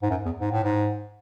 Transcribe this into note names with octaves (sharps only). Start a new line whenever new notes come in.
G#2
F#2
E2
G#2
A2
G#2